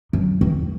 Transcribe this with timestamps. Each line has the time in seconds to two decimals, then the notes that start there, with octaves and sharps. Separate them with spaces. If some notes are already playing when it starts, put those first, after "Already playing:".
0.13 F#2
0.41 E2